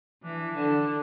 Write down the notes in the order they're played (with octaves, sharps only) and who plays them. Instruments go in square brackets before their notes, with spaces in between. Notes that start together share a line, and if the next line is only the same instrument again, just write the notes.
[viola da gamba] E3 [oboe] D4
[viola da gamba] D3